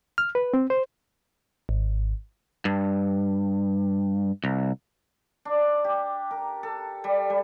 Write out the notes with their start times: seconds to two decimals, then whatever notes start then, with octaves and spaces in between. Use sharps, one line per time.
0.18 F6
0.35 B4
0.54 C4
0.70 C5
1.69 G#1
2.65 G2
4.44 C2
5.45 D4
5.84 G4
6.31 A#4
6.63 A4
7.04 G3
7.30 G3